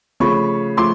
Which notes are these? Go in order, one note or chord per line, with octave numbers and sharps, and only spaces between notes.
C#3 F3 A3 B5 C#6
F3 A3 C6 D6